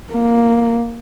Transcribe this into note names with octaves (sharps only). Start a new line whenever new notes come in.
A#3